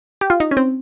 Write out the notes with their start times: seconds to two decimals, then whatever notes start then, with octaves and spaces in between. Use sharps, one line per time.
0.21 G4
0.30 F4
0.40 D#4
0.51 C#4
0.57 C4